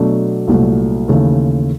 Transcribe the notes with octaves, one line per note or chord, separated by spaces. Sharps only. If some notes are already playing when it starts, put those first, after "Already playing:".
Already playing: B2 F#3 A3 D4
C2 A#2 F#3 A3
D#2 C#3 E3 A3